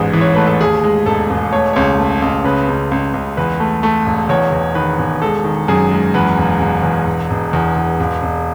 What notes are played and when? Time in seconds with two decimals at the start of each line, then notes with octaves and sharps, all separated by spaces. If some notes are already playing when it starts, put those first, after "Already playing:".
Already playing: A1 E2 G#2 G#4
0.13 E3
0.21 C#5
0.35 A3 B4
0.47 A4
0.60 D#2 G#4
0.84 G#3
1.06 E1 A4
1.30 E1
1.52 A3 C#5
1.73 C#2 C#5
1.98 A3
2.22 C#2
2.44 C#3 B4
2.68 C#2
2.91 C#2
3.14 C#2
3.37 E2 B4
3.60 A3
3.83 A3
4.06 E1
4.29 E2 C#5
4.52 E2
4.75 D#3 B4
4.98 E1
5.22 G#3 A4
5.44 D#3
5.68 F#2 G#4
5.92 G#3
6.14 E2 B4
6.38 E1
6.60 E1
6.83 E2
7.06 E1
7.30 E1
7.53 E2
7.76 E2
8.00 E1
8.23 E1